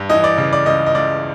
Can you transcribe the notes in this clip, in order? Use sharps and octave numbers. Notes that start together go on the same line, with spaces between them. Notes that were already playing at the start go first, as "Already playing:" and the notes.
Already playing: G2
E3 D#5
D5
C#3
D5
C#2 D#5
D#5
C#2 D5